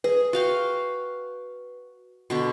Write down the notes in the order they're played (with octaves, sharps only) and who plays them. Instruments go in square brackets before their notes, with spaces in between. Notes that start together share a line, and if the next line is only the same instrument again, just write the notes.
[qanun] G#4 [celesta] B4
[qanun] F#4 F5 G5
B2 D3 C#6